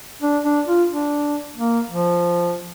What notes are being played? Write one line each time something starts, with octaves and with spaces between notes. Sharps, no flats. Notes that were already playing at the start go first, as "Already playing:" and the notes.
D4
D4
F4
D4
A#3
F3